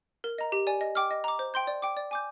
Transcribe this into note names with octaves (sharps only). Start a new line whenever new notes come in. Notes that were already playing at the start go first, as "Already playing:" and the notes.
A#4
D#5 A#5
G4
D5 G#5
D#5
G5 D6 F6
D#5
A#5 D6
C5
G5 C6 G6
D5
G5 D6
D5
G#5 D6 G6